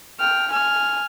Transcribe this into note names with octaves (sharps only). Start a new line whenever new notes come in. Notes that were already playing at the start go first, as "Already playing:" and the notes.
G5 F6
G#5 F6